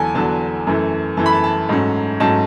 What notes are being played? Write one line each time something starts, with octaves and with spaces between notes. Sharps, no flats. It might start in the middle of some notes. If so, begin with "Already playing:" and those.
Already playing: E2 D3 F#3 A4 G#5
E2 D3 F#3 A5
F#2 E3 A3
F#2 E3 A3 A5
B5
A5
A5
G#2 F#3 A3 C#4
G#2 F#3 A3 C#4 A5